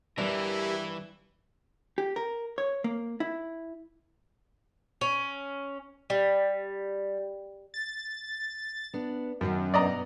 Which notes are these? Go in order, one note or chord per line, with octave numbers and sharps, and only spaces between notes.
G2 E3 E4 G4 A#4
G4
A#4
C#5
A#3
E4
C#4
G3
A6
B3 D4
F#2 D#3 E3 F#3
G2 B2 B3 D5 D#5 A#5